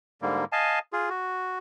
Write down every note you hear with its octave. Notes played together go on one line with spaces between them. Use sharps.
G#2 D3 G3 A#3
D#5 F5 G#5 A5
F4 G#4
F#4